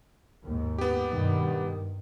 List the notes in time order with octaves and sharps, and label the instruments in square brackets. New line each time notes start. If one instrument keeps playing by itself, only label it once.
[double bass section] D#2 G#2
[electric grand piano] B3 G4
[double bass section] G2 B2 D#3